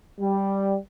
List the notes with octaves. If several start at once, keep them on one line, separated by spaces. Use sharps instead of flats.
G3